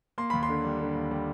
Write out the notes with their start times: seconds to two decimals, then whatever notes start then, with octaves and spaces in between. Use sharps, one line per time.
0.18 A#3 C6
0.30 D#2 B5
0.43 C6
0.49 D3
0.64 G3
0.80 D3
0.95 D#2
1.11 G3